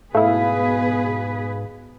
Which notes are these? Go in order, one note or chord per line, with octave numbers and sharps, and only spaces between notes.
G#2 B2 A3 E4 G#4 B4 F5